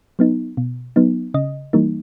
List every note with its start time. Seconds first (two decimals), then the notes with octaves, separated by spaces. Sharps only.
0.19 F#3 B3 D#4
0.57 B2
0.96 F#3 B3 D#4
1.34 C#3 D#5
1.73 E3 G3 A#3 D#4